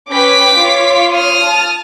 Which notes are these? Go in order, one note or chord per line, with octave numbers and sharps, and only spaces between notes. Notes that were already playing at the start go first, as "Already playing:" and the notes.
C#4 B4 G5 D6 B6
F4 C#5
D#6 F6
A5